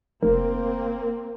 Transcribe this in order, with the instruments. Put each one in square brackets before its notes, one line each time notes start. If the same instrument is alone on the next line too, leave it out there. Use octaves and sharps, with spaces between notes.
[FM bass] F1 [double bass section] A#3 C4 [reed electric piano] A#4